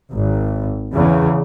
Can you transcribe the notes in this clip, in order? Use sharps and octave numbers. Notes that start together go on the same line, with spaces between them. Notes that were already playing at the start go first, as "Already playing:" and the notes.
G#1
E2 C#3